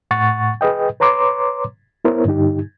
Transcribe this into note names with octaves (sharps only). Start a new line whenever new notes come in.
A2 F#5 C#6 A6
G#4 B4 D#5 G5
B4 C#5 A#5 C6 D6
B3 E4 A#4 C5 C#5
G2 D3 D#4 G4